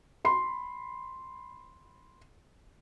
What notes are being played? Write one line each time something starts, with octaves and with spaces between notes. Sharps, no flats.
B5 C6